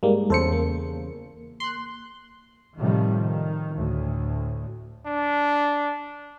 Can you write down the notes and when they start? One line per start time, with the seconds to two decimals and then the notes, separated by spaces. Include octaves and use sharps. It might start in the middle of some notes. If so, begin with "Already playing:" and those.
0.03 G#2 G3 G#3 A#3
0.30 E2 C#3 A4 C5 C#7
0.52 A#3
1.60 C6 F#6
2.77 A2 C3 D#3 F3 G3
3.16 D#3
3.76 D2 A2
5.06 D4